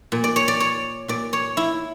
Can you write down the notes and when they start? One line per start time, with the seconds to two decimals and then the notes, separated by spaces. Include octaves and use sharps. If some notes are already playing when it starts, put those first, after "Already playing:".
0.12 A#2
0.24 D5
0.36 C#5
0.48 D5
0.60 C#5
1.08 A#2 D5
1.33 C#5
1.57 E4